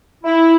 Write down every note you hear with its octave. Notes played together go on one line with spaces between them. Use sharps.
E4